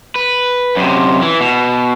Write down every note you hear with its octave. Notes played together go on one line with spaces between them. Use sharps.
B4
F#2 C3
E3
B2